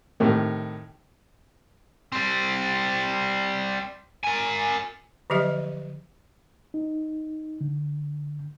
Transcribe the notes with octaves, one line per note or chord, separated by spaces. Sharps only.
A2 C3 D#3
G3 C4
A#4 G#5
D3 F3 F#3 G4 D#5 E5
D#4
D3